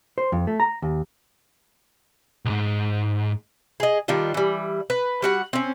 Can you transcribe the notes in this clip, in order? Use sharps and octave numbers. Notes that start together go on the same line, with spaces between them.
C5
F2
A3
A#5
D#2
B1 G#2
G#4 D#5
D#3 G3 D4 F4
E3 G3
B4
G3 F#4 F#5
C4 C#4